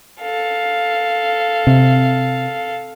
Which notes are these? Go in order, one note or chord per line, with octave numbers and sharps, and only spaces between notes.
A4 F5
C3